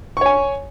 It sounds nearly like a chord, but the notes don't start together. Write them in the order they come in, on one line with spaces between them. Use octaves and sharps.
C#6 C#5 G#5